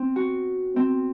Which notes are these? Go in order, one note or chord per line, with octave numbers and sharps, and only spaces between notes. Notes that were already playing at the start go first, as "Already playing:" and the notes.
Already playing: C4
F#4
C4